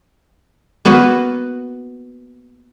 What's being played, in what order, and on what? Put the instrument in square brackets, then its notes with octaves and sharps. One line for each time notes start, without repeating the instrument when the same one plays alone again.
[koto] A#3 B3 F#4 B4